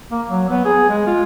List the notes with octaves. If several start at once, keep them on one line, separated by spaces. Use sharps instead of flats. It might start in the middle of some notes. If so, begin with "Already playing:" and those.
A#3
F#3
B3
G#4
G#3
F4